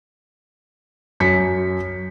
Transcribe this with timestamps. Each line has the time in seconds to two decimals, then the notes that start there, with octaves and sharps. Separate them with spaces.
1.20 F#2 B6 C#7